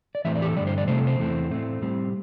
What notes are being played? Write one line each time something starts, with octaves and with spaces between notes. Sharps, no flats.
D5
A2 E3 A3 C4 E5
D5
G4
A4
G2 D3 G3 D5
C5
D5
C3 A3 C4 C5
A4
C5
E2 E3 A3 C4
A2 A3 C4
A2 G3 C4